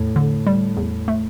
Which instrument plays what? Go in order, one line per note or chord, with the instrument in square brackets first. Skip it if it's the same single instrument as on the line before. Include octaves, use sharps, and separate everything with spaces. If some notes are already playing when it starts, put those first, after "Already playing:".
Already playing: [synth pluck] E2 [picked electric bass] A2
[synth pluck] D3
G3
E2
A3